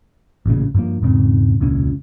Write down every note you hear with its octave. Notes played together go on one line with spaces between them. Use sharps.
A1 A#2 C#3
G2 F3 A#3
E1 G#2 C#3 C4
E1 C#2 A#2 C#4